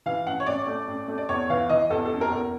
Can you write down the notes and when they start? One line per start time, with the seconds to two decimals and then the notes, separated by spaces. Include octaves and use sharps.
0.06 E3 F5
0.26 A1 F#5
0.40 C#5
0.46 A1 D5
0.67 A3
0.87 A1
1.08 A3
1.18 D5
1.29 E2 C#5
1.50 E3 F5
1.69 E3 D#5
1.90 E2 A4
2.06 A4
2.11 F#1
2.21 A#4
2.31 E2